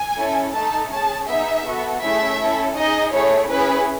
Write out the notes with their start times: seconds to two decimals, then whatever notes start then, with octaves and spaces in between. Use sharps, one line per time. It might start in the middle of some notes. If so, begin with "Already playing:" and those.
Already playing: G#5
0.18 C#4 E4 A4
0.54 A3 D#4 A4 A5
0.91 C#4 G#4 A5
1.28 B3 D#4 G#4 E5
1.66 B3 F#4 A4
2.02 A3 C#4 E4 G#4 E5
2.40 C#4 E4 A4
2.76 D#4 G#4 D#5
3.13 A3 E4 G#4 C#5
3.50 C#4 E4 G#4 B4